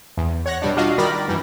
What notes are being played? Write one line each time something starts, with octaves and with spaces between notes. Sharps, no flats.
E2
C#5 F#5 A#6
B2 G3 D4
D4 F4 F#4 D#5 F5
D#3 G3 A#4 D5 B5 A#6
F#2 E3 G3